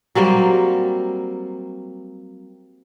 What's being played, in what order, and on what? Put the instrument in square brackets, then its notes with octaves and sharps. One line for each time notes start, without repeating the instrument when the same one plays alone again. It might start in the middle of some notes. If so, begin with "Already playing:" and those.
[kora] F#3 G3 A#3 C4